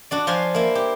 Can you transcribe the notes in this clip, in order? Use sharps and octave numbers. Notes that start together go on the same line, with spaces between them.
D4 F#4 D5
F3 F4 C5 G#5 C6
A#3 E4
G4